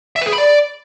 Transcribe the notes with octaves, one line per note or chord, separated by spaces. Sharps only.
E5
B4
G#4
B5
D5